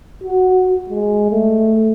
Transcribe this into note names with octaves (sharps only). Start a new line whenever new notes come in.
F#4
G#3
A3